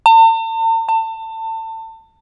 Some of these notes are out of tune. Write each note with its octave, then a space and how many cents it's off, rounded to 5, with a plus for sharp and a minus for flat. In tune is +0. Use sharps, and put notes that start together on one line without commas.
A5 +45
A5 +30